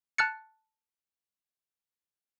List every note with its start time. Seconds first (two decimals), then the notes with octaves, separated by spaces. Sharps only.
0.18 A5 F6 F#6 A6 C#7